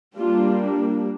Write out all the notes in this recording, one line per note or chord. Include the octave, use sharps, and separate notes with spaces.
G3 A#3 D4 F4